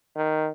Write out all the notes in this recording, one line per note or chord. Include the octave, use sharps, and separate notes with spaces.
D#3